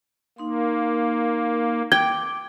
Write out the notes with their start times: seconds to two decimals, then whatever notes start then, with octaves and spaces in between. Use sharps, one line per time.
0.38 A#3 D#4 C6
1.92 G5 D6 G#6